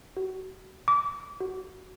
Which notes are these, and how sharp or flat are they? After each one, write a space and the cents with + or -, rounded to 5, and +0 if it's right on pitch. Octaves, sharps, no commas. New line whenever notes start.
F#4 +35
D6 -25
F#4 +15